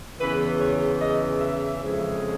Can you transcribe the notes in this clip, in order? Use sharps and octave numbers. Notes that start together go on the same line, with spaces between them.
E2 C#3 E3 B4
C#5
D#5
E5
F2 C#3 F3 G#3